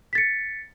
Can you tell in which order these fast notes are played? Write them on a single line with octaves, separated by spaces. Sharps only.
B6 A6 C#7